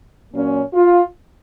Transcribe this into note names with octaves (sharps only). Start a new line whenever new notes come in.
A#2 F#3 A#3 C#4
F4